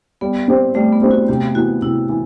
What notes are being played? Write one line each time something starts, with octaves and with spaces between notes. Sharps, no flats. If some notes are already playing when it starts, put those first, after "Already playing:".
G3 B3
C4 G4 C5
G3 A3
B3
C4 G4 C5
F#4
C3 G4
E3 B3 F#4
C3 E4
E3